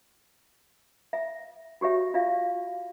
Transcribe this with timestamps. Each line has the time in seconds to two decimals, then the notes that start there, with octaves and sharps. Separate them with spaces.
1.13 E5
1.81 F#4 G4 C#5 E5
2.14 F4 D5 E5 F5